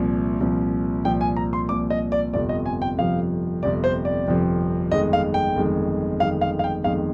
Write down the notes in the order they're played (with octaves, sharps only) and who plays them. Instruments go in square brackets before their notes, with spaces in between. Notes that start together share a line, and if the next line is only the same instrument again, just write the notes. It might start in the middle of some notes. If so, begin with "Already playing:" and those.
Already playing: [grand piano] C2 A#2 F3
C2 A#2 F3
C2 A#2 F3 G5
G#5
A#5
C6
C2 A#2 F3 D6
D#5
D5
G1 F2 C3 F3 D5
D#5
G#5
G5
G1 F2 C3 F3 F5
G1 F2 C3 F3 D5
C5
D5
G1 F2 C3 F3
G1 F2 D#3 G#3 D#5
F5
G5
G1 F2 D#3 G#3
G1 F2 D#3 G#3 F5
F5
F5
G5
G1 F2 D#3 G#3 F5